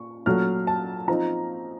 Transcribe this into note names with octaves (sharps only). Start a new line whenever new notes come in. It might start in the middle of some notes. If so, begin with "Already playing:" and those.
Already playing: A#2 C#6
A#2 F#3 A3 F6
A5
F3 C4 D#4 A#5